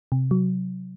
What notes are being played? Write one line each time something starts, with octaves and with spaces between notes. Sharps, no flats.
C3
F#3